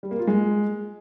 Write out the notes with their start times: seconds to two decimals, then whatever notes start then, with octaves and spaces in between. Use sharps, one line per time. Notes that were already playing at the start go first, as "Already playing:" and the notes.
0.03 G3
0.11 A#3
0.19 F4
0.27 G#3